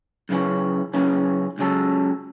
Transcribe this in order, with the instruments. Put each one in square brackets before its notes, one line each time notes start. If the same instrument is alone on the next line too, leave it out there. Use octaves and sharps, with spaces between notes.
[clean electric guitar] F#2 C#3 E3 C#4
F#2 C#3 E3 C#4
C#2 C#3 F#3 C#4 A4